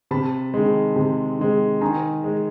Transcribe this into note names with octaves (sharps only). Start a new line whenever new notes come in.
C3 A5 B5
D#3 G#3
C3
D#3 G#3
D#3 G#5 A#5
G#3